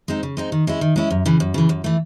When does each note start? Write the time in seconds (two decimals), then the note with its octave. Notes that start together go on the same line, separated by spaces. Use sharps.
0.08 G#3 C4 D#4
0.23 C#3
0.37 G#3 C4 D#4
0.52 D#3
0.67 G#3 C#4 E4
0.81 D#3
0.96 G#3 C#4 E4
1.10 F#2
1.26 C#3 E3
1.40 F#2
1.54 C#3 E3
1.69 F#2
1.84 E3 A3